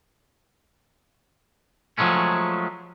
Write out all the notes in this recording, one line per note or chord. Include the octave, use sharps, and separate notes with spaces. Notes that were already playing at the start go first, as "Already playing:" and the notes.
F3 F#3 G#3 A3 C#4